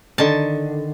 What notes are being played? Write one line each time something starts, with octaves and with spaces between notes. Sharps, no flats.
D3 D#3 A5